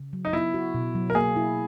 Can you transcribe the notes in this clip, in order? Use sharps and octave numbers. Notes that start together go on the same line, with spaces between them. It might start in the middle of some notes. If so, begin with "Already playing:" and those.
Already playing: C#3
F#3
D#4
B3 E4
F#4
B2
F#3
A#4
A#3 G#4
E4